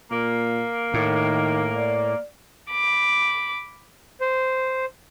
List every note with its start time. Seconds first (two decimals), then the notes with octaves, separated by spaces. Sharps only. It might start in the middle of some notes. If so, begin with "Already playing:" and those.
0.11 A#2 A#3
0.94 A2 D#3
1.76 D5
2.71 B5 D6
4.21 C5